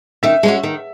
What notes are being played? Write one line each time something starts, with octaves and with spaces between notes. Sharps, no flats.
D#3 E5
G#3 C#4 F#4
D#3